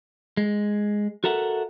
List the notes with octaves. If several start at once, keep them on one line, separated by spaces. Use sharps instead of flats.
G#3
F#4 A4 A#4 E5 F#5